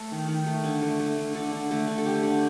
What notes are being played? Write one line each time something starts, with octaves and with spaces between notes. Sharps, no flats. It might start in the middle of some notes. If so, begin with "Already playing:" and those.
Already playing: A3 A4
D#3
D#3
A3
D3
A3
A3
D3
D3 A4
D3
A3
D3
A4
A3 G4
D3